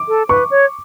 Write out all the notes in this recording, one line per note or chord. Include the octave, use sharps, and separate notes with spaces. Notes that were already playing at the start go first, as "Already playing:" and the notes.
Already playing: D6
A4
B4 C#6
C#5